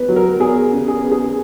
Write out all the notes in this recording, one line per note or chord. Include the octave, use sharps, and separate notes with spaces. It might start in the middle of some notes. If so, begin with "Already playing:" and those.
Already playing: B3 B4
F#3
A#4
E2 G#4
C#3
G#4
B3
G#4